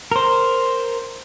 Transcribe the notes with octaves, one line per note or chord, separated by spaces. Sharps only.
A#4 C5